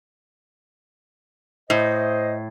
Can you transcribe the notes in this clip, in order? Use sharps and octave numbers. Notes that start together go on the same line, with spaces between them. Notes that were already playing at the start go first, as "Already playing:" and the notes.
A2 C5 D#5